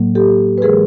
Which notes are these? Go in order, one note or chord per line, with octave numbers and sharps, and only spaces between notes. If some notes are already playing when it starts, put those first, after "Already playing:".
Already playing: A2 F#3 A#3
G4 A4
B4
E3 G#3 G#4 A#4